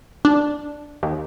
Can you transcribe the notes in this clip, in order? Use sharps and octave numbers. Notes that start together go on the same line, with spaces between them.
D4
D#2